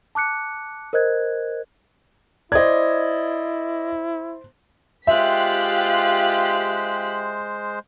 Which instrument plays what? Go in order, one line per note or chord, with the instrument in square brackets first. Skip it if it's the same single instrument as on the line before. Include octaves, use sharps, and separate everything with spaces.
[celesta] A5 D6 F#6 C#7
A#4 C5 D#5 F#6 G#6
[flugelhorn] E4 [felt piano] C5 G#6 [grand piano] D5 D#5
[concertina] G#3 C5 [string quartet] F4 [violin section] G4 F#6 B6 [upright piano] E5